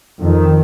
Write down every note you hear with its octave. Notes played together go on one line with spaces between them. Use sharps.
F2 D#3